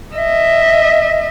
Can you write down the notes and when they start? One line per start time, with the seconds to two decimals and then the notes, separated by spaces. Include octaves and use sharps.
0.15 D#5 E5